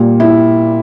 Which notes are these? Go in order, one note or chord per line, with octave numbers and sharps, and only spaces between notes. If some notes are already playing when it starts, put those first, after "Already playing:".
Already playing: A#2 G3
E4